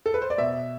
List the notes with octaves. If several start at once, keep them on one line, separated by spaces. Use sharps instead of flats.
A4
B4
C5
D5
B2 E5